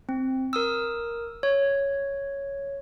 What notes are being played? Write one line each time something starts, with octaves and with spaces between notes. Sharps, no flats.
C4
A#4 D#6 E6
C#5